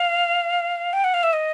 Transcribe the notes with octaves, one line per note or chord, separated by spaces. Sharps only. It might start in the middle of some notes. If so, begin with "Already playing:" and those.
Already playing: F5
G5
F#5
F5
E5
D#5